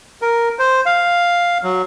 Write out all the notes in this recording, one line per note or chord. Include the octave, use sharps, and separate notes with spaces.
A#4
C5
F5
F#3